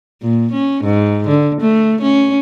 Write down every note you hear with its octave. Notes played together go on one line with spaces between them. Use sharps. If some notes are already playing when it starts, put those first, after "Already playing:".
A#2
C#4
G#2
D3
A3
C#4